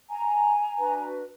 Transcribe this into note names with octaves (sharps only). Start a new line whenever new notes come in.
G#5 A#5
D4 F#4 B4